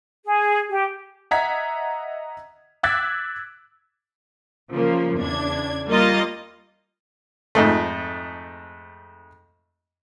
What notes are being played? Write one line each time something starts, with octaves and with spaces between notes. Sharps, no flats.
G#4
G4
D#5 E5 F#5 A#5 G#6 B6
D6 E6 F#6 G#6 A6 B6
C#3 F3 A#3
E2 C#3 D4 G#6
G3 A#3 F4 D#5 A6
F2 G#2 A3